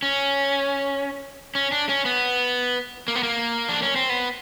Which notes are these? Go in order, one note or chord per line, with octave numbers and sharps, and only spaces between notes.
C#4
C#4
D4
C#4
B3
A#3
B3
A#3
D4
C#4
C4
B3